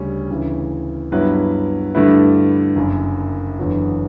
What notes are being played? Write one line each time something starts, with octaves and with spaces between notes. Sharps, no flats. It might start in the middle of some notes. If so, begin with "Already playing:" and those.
Already playing: D2 C#3 G3 C#4
D2 C#3 E3
G2 F#3 B3 E4 B4
G2 D3 A3 E4 B4
F#1 F#2 D3
F#1 E2 D3 F#3 B3